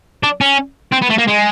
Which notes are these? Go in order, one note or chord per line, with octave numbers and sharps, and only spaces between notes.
D4
C#4
C4
B3
A3
A#3
G#3